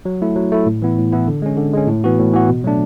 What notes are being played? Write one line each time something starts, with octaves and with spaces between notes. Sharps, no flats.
F#3
A3 E4
F#3
A3 E4
A2
E3 B3 E4
A2
E3 B3 E4
D3
G#3 C#4
D3
G#3 C#4
A2
E3 B3 F#4
A2
E3 B3 F#4
B2
F#3 A3 D4